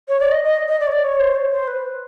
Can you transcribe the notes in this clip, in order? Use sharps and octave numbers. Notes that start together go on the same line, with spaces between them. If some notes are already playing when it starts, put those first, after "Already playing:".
C#5
D5
D#5
D#5
D#5
D5
C#5
D5
C#5
C5
C#5
C5
B4